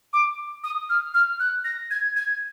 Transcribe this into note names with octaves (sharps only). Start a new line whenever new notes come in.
D6
D#6
F6
F6
F#6
A#6
G#6
G#6